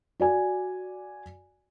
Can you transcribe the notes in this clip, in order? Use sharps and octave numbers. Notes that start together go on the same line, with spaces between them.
F#4 D5 G#5